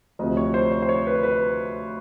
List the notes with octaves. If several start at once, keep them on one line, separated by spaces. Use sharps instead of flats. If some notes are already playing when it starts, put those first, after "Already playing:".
D2 C3 F3 D#5
C#5
C5
C#5
C5
C#5
B4
B4